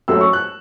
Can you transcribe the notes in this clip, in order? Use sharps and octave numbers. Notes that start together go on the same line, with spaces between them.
F#2 F#3 A3 E6
C#6
F#6